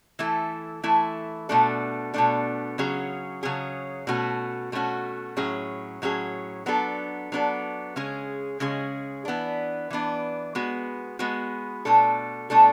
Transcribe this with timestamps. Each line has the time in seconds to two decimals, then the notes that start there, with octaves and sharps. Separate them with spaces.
0.19 E3 A3 E4 A4
0.83 E3 A3 E4 A4
1.49 B2 A3 D4 A4
2.14 B2 A3 D4 A4
2.78 C#3 F#3 C#4 G#4
3.43 C#3 F#3 C#4 G#4
4.07 B2 A3 C#4 F#4
4.72 B2 A3 C#4 F#4
5.37 A2 F#3 C#4 G#4
6.02 A2 F#3 C#4 G#4
6.66 F#3 B3 D4 A4
7.32 F#3 B3 D4 A4
7.96 C#3 G#3 C#4 G#4
8.60 C#3 G#3 C#4 G#4
9.25 E3 B3 D4
9.90 E3 B3 D4
10.55 G#3 B3 F#4
11.19 G#3 B3 F#4
11.85 B2 A3 D4 A4
12.50 B2 A3 D4 A4